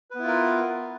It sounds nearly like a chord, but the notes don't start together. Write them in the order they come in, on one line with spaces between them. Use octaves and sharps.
B4 B3 E4 F4 A#4